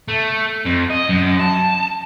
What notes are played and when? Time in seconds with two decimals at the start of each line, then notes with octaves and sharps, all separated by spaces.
0.08 A3
0.66 F2
0.90 D#5
1.09 F#2
1.40 A5